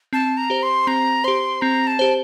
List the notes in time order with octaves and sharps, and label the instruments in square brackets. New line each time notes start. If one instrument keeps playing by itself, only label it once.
[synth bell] C4 [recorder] A5
[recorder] A#5
[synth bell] G4 C5
[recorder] C6
[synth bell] C4 [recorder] A#5
[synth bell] G4 C5 [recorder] C6
[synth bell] C4 [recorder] A#5
[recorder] A5
[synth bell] G4 C5